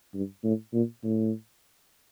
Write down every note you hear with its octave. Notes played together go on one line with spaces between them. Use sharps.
G2
A2
A#2
A2